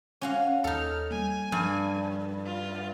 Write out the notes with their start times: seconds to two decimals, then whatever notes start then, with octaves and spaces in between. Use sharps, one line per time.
0.21 C#4 F#4 F5
0.64 D#2 D#4 A4 F6
1.11 G3 A#3 G#5
1.52 G2 F3
2.45 F4